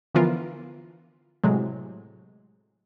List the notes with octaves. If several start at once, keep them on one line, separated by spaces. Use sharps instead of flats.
D3 E3 F3 B3 F4 A#4
A2 C3 F#3 G#3